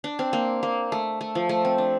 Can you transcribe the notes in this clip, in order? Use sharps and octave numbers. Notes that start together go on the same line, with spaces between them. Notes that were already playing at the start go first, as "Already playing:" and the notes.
D4
C4
A#3
A#3
A3
A3
F3
A3
C4
D4